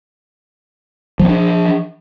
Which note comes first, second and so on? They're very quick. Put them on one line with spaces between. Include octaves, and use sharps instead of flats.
F3 C4 D4